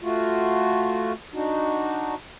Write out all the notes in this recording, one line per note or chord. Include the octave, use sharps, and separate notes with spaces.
A3 F4 F#4
D4 D#4 F#4